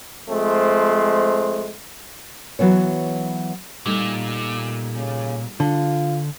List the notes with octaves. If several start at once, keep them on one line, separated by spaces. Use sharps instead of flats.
F3 G#3 A3 C4
E3 F#3 B3 C#5
A#2 G3 A3 D#4
C#3
D3 F4